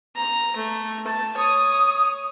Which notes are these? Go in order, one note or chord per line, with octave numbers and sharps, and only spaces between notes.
A#5
A3
A5
C#5 D#6